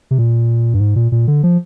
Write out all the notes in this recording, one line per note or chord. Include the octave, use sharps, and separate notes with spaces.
C3
A#2
G2
G#2
A#2
A#2
D3
F3